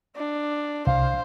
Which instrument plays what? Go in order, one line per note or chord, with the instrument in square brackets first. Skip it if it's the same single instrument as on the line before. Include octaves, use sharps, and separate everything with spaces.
[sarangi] D4
[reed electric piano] C2 [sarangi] C5 [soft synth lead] F5